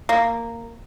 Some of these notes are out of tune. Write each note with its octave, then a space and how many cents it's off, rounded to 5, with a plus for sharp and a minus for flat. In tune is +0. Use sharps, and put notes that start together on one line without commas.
A#3 -10